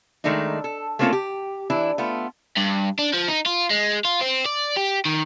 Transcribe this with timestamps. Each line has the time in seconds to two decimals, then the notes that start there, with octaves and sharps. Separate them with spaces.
0.24 D#3 G#3 A3 D4 D#4
0.64 A4
0.99 A3 A#3 C4 C#4 F4 A4
1.13 G4
1.70 E3 D4 E4
1.98 A3 B3 F4
2.57 G2
2.99 D4
3.13 F3
3.28 D#4
3.46 F4
3.70 G#3
4.05 F4
4.21 C4
4.45 D5
4.76 G4
5.05 D#3